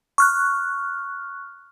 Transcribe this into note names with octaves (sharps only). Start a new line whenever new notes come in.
C#6 F6 F#6